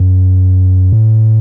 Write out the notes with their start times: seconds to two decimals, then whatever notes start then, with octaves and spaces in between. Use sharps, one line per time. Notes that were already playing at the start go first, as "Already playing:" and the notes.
Already playing: F#2
0.92 A2